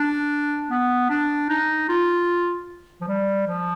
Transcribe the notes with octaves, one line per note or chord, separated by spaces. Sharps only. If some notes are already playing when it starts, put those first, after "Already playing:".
Already playing: D4
B3
D4
D#4
F4
F3
G3
F3